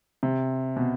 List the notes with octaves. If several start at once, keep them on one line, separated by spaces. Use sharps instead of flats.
C3
B2